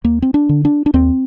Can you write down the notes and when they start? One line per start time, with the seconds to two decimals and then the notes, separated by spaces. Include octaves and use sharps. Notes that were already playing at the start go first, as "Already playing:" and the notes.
0.04 D#2 A#3
0.22 C4
0.34 D4
0.49 D3
0.65 D4
0.86 D4
0.94 D#2 C4